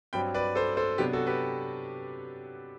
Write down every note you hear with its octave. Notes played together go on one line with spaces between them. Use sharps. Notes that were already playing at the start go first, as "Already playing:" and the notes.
G2 F#3 C4 G5 B5
B4 D5
A4 C5
A4 C5
C3 F#3 B3 D4 G4 B4
F#4 A4
G4 B4